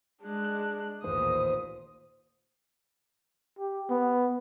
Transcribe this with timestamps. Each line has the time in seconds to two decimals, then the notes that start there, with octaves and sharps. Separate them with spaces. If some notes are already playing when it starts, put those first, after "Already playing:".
0.24 G#3 D4 F#6
1.04 A1 D#2 A#2 C5 D#6
3.59 G4
3.89 B3